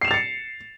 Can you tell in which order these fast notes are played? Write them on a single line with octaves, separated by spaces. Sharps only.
C7 E7 F7 A6 C#7